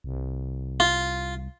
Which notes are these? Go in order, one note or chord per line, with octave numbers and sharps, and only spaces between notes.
C2
F4